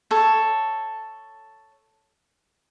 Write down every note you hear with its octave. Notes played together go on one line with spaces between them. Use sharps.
A4 C#5